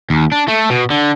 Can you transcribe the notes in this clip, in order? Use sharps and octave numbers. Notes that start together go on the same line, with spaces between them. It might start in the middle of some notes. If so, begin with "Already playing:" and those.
D#2
D4
A3
B2
D3